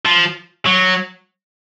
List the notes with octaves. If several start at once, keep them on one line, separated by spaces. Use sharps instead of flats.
F3
F#3